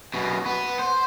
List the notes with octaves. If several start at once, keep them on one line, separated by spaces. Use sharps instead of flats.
F#2 B2
B3
C5